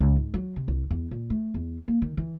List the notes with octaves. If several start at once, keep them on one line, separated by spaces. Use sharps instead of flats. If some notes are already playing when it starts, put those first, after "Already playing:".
C#2
G#2
F#3
C3
C2
E2
A#2
A3
E2
A#3
D#3
E3